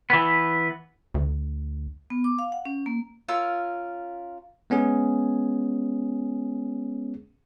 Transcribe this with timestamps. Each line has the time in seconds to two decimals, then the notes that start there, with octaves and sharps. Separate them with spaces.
0.10 E3 B3
1.14 D2
2.10 B3
2.24 D6
2.39 F5
2.52 F#5
2.65 C#4
2.86 A#3
3.29 C#4 F4 A#4 E6
4.70 G#3 B3 C#4 G#4